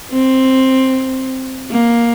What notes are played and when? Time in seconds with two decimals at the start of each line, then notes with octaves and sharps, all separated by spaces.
0.12 C4
1.71 A#3